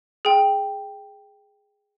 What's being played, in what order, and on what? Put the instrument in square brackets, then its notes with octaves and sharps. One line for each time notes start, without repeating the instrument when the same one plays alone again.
[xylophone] G#4 G5